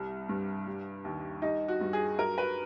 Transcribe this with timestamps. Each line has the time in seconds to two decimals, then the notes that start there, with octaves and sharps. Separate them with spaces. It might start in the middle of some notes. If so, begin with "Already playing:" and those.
Already playing: C2 G3
0.29 G2
0.67 G3
1.05 D#2
1.42 G3 D#4
1.68 F#4
1.81 G2
1.93 G#4
2.19 F#3 A#4
2.38 B4